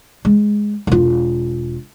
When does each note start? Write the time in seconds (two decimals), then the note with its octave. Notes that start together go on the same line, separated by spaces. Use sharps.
0.25 G#3
0.87 E1 F4